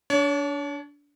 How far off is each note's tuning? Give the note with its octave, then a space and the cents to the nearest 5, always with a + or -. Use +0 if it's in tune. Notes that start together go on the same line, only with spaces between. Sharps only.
D4 -25 C#5 +30